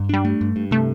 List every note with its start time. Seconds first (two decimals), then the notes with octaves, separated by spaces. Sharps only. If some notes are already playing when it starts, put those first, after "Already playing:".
Already playing: G2
0.09 G3 D4
0.25 A3
0.41 G2
0.56 G2
0.71 C3 A3